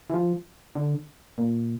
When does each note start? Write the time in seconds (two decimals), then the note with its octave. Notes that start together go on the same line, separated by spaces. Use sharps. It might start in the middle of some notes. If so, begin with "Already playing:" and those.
0.10 E3
0.14 F3
0.75 D3
1.38 A#2